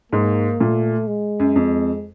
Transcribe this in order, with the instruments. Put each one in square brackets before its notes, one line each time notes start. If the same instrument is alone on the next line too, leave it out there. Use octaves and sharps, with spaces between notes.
[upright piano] G#2 [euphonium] A#3
[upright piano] A#2 [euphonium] A3
[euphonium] G#3
[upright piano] F#2
F2